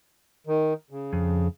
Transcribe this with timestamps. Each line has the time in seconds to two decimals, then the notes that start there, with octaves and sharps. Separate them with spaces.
0.47 D#3
0.91 C#3
1.13 F2